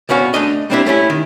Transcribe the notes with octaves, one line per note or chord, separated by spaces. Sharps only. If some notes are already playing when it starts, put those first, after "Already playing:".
C2 B2 C#4 F#4 F5
A3 D4 D#5
G3 A#3 C4 D4 E4 G4
A3 C#4 E4 G4
D#3